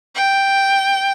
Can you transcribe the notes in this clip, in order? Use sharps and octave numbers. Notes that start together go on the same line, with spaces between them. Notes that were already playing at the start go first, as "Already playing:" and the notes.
G5